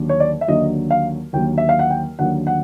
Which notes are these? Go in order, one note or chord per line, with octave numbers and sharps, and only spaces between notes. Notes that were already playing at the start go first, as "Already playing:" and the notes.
Already playing: D#2 D3 F#3 A#3
C#5
D5
E5
D#2 D3 F#3 A#3 D#5
F5
D#2 D3 F#3 A#3 G5
E5
F5
F#5
G5
D#2 D3 F#3 A#3 F#5
F#5